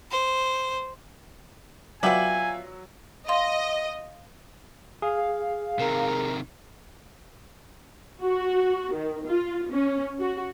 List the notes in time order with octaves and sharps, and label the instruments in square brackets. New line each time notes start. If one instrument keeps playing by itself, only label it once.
[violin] C5
[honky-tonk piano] F#3 [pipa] B3 G4 D5 [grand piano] F4 E5 F#7 [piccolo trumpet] G#5
[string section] D#5 [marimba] F5 C6
[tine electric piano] G#4 [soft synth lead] F5
[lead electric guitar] C3 D#3 [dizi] A#4
[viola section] F#4
D#3
F4
C#4
F#4